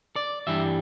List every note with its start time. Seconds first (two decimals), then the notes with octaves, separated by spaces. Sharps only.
0.16 D5
0.47 G2 E3 G3 E5